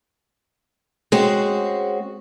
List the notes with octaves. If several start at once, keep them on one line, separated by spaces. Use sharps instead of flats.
G#3 C4 C#4 F#4